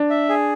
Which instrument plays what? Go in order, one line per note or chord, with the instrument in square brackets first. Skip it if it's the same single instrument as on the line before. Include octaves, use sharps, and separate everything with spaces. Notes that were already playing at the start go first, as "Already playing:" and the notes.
Already playing: [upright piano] D4
[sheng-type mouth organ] E5
G#4